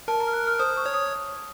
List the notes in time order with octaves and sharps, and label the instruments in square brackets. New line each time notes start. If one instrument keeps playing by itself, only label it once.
[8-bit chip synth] A#4 [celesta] A5
[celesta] A#5
F6
F#6
F6
[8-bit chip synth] C5 [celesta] D#6
[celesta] C#6
[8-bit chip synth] C#5
[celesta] D#6